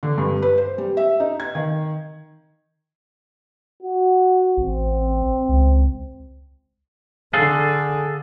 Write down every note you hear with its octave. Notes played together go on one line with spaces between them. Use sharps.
D3
G2
B4
C5
G3
E5
D#4
G#6
D#3
F#4
A1 C4
C#2
D3 G#4 A4 F5